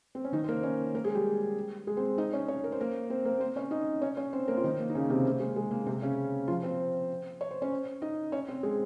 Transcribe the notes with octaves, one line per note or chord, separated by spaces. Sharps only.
C4
C#4
D#3 D#4
C5
A#3 A#4
C#4 C#5
A#3 A#4
G#3 G#4
G3 G4
G#3 G#4
C4 C5
D#4 D#5
C#4 C#5
C#4 C#5
A#4
C5
A#3 A#4
C4 C5
A#3 A#4
C4 C5
C#4 C#5
D#4 D#5
C#4 C#5
C#4 C#5
C4 C5
A#3 A#4
F4
D#3 D#4
A#3
D#4
C#3 C#4
C3 C4
A#3
G#3
G#3
A#3
C3 C4
C#3 C#4
F3 F4
C4 C5
C#5
C5
C#4 C#5
D#4 D#5
C#4 C#5
C4 C5
G#3 G#4